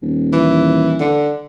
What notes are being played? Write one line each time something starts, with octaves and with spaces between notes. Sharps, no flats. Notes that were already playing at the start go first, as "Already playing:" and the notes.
D#1
E3
D3